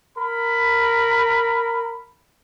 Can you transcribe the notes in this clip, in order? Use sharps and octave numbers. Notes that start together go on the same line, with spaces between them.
A#4 B5